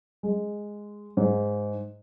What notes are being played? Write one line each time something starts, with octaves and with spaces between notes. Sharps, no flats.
G#3
G#2